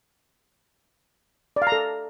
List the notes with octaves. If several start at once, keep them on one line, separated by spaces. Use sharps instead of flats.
D5
F5
A#5
A4